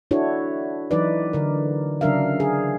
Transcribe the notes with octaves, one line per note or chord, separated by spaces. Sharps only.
D4 E4 F#4 A4 C#5
E3 F#3 D#4 B4 D5
D3 A#4
C#3 F#3 D4 A#4 E5 F5
G#4